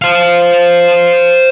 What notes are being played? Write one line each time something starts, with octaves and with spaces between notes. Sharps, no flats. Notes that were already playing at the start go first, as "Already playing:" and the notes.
C5 F5